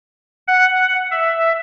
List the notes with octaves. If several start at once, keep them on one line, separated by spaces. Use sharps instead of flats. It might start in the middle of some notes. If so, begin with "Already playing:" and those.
F#5
E5